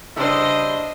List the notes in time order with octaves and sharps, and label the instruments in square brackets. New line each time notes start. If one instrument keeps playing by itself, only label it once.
[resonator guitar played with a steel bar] C#3 G3 E4 [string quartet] D4 C5 D#5